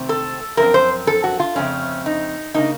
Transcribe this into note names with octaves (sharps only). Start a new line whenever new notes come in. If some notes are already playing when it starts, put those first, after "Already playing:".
Already playing: C3 D#3 A3 C4
A4
F#2 F3 C4 A#4
C5
A4
F#4
F4
F2 C#3 A3 C4 C#4
D#4
C#3 F3 A#3 D#4